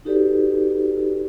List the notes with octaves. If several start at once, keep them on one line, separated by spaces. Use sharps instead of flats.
D#4 F#4 G4 A4 B4 D5